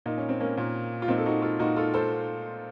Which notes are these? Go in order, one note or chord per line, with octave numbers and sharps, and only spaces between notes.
A#2 D#4
C#4
C4
A#3 C#4
A#2
F4
A#2 C4 D#4
A4
D#4 F#4
F4 A4
A#2 D#4 F#4
F4 A4
A4 C5